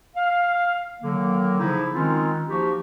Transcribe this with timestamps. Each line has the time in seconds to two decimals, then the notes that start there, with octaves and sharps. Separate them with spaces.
0.15 F5
1.03 D3 D#3 F#3 A#3
1.60 C#3 F3 D#4 E4
1.94 D#3 G#3 C4 C#4 D#4 F4
2.47 F3 A#3 D#4 F#4 G4